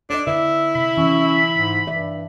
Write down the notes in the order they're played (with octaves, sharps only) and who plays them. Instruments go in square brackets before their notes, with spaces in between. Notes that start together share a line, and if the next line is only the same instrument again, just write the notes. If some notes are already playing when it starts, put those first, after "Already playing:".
[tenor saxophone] D4 [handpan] D5 D#5
[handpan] D3 B4 [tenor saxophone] E4
[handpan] C3 [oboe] B5
[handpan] E3 [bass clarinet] C#4
[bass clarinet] G#2
[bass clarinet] G2 [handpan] E3 D5 E5